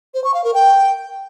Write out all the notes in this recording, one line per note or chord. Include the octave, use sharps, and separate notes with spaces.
C5
C#6
F5
A#4
G5